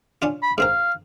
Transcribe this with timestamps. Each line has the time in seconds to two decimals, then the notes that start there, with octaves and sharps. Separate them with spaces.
0.22 C#4 D4 F4
0.42 B5
0.58 G#2 C4 A#4 F5